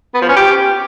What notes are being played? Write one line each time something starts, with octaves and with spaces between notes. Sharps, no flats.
B3
F3
C#4
G4